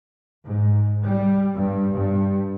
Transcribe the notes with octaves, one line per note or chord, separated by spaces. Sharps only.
G#2
G3
G2
G2